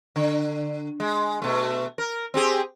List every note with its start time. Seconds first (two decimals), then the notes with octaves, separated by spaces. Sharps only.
0.16 D3
1.00 G#3
1.42 B2 A3
1.98 A#4
2.34 C4 G4 G#4